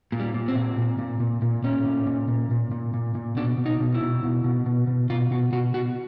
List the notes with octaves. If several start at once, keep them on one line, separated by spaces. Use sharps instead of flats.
A#2
G3
A#2
C4
A#2
A#2
A#2
A#2
A#2
A#2 C#4
A#2
A#2
A#2
A#2
A#2
A#2
A#2
B2 D4
B2
D#4
B2
E4
B2
B2
B2
B2
B2
B2 F4
B2 F#4
B2 F#4
B2 F#4